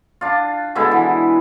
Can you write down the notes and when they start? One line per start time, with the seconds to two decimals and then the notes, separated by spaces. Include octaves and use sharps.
0.21 D4 F4
0.75 B2 D3 G#3 E4
0.92 E3